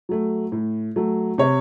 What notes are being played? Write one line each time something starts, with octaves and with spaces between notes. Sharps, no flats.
F#3 A3
A2
F#3 A3
C3 C#5